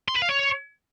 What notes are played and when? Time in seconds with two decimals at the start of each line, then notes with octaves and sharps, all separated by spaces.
0.08 C6
0.15 B4
0.22 F5
0.29 C#5